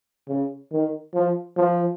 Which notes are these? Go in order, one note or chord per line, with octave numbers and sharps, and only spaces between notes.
C#3
D#3
F3
F3